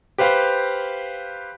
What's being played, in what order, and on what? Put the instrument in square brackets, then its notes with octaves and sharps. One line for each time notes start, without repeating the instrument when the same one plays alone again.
[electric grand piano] G4 B4 C5 F5 G5